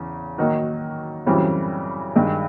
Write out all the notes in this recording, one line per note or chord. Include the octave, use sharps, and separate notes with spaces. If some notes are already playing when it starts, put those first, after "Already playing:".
Already playing: E2 C#3
D#3 F#3 A#3 D#4 F#4
F#2 C#3 E3 G3 C4
G2 D#3 G#3